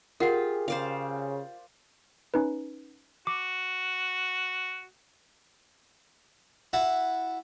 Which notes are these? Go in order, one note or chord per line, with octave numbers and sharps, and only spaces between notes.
F4 G4 G#4 A#4 F#5
C#3 C5 D5 F5
C#4 D#4 B4
F#4 D6
E4 F#4 F#5 A5